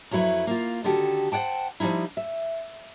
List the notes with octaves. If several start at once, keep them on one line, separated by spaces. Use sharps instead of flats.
F2 F#3 A3 E4 B4
A#3 F4
D3 D#3 F#4 G4 A4
C5 D5 F#5 G5 A5
F3 G3 G#3 D#4 E4
E5